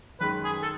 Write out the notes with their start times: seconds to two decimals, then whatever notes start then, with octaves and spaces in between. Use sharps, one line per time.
0.20 F#2 D#3 G#3 B4
0.44 G#4
0.62 A4